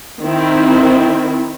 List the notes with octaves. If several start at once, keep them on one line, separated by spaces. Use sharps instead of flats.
D#3 C4 E4